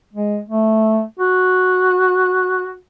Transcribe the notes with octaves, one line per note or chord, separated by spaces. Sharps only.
G#3
A3
F#4